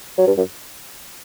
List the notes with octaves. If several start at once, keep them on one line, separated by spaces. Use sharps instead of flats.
F#3
G2
F#2